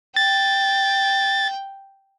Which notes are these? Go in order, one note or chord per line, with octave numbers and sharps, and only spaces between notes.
G5 A6